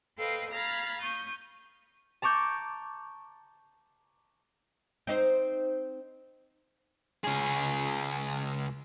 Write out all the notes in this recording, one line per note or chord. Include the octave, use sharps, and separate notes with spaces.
A4 B4 C5 D#5 F5 G5
F5 A#5 B5 F6 G#6 A6
C#6 D#6 G6
A5 A#5 C#6 D6 G6
C4 D#4 C5
C#2 G#4